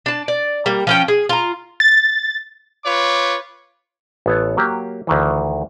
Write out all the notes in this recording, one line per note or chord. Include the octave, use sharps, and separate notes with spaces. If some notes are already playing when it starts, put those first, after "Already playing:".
D4 A5
D5
G3 A#3
F3 C#4 G5
G#4
F4 A#5
A6
F4 B4 C#5 D6
A1 B3 A4 C#5
F#3 A#3 G4
D2 D#3 E3